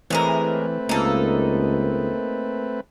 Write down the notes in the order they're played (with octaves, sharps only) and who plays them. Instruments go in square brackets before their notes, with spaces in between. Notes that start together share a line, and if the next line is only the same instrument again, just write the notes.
[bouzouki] A2 G#3 A#4 [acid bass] E3 [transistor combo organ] A3 C4 B4
[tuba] C#2 [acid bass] A#3 [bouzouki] D#4 A4